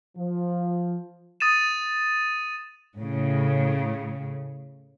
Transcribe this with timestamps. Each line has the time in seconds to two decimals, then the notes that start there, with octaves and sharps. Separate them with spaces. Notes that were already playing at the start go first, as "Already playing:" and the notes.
0.17 F3
1.40 D#6 A6 D#7 E7
2.95 A2 C#3